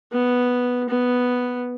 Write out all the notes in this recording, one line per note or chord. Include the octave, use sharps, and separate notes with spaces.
B3
B3